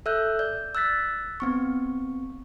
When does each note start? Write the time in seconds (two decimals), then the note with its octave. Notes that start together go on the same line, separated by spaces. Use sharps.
0.06 A4 E5 E6 F#6 G6
0.39 D5 G6
0.75 E6 F#6 A6 B6
1.40 B3 C4 C#6